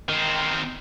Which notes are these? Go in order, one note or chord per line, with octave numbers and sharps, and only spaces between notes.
D#3 C4